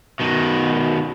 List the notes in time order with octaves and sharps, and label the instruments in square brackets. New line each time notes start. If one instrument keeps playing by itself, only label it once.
[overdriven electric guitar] B2 D#3